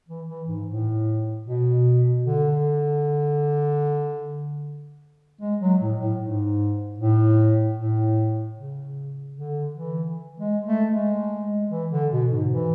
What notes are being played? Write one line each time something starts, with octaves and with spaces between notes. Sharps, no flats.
E3
E3
G#2
A2
B2
D3
G#3
F#3
A2
A2
G#2
A2
A2
C#3
D3
E3
G#3
A3
G#3
E3
D3
B2
G#2
E3